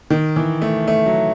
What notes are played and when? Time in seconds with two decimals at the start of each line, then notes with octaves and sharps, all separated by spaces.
0.10 D#3
0.36 E3
0.62 A3
0.87 A3
1.06 F#3